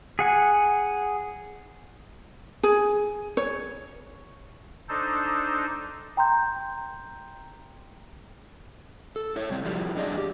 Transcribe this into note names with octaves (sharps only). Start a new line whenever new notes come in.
G#4 F#5 G#5
G#4
C#5
D4 D#4 A4 C5
G5 A#5 C6 G6
A4
E4 A4 C#5
C3 G3 C4
E3 F3 G3
G2 G3 D4 G#4 D5 D#5
G4